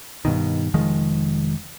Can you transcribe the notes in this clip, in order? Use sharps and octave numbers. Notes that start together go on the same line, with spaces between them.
G2 B2 D#3
F1 D#3 F3 G#3